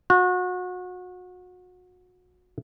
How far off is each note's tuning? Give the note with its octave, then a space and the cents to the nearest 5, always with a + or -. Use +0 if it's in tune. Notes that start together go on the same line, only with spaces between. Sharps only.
F#4 -30